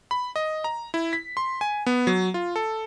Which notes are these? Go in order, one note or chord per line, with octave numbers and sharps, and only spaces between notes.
B5
D#5
A#5
E4
B6
C6
G#5
B3
F#3
F4
A4